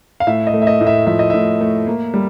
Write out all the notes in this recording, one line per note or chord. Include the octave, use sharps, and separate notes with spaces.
F5
A2 E5
D#5
A3
E5
D#5
A2
E5
F3 E5
D#5
A2 E5
A3
A#3
G3